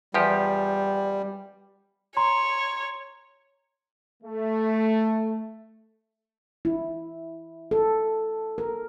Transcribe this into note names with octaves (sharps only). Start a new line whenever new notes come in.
E2 F3 G3 G4
C#5 A#5 C6
A3
E4
A4
A#4